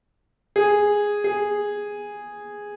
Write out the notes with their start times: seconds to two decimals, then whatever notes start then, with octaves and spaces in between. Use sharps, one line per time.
0.56 G#4
1.24 G#4